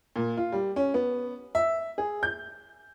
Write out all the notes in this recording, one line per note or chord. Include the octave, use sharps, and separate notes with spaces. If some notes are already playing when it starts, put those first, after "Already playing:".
A#2
F4
G3
C#4
B3
E5
G#4
G6